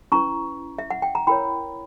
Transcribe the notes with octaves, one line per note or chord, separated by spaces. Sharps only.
C#4 E4 B4 A#5 C#6
E5
F#5
G5
A#5
E4 A#4 C#5 G5 B5